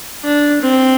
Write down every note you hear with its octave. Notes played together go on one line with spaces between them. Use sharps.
D4
C4